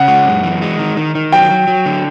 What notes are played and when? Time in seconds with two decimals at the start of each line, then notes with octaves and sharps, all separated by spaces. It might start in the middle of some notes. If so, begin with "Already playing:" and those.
Already playing: C#3 F#5
0.08 G#3
0.26 F#2
0.43 E3
0.62 G#3
0.79 D#3
0.97 D#3
1.15 D#3
1.32 F#3 G5
1.51 F#3
1.68 F#3
1.86 D3